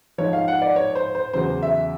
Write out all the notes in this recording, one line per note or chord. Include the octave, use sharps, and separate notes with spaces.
G#2 F3 C#5
F5
F#5
D5
C#5
C5
C5
E2 C#3 F#3 C5
E5